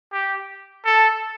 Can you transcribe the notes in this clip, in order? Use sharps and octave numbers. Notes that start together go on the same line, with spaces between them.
G4
A4